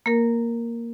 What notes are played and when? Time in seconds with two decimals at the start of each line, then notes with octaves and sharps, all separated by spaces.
0.06 A#3 A#4